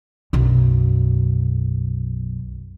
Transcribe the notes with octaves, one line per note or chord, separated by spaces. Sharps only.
B1 F#2